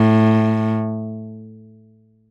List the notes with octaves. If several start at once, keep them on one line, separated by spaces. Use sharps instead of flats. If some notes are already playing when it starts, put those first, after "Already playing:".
Already playing: A2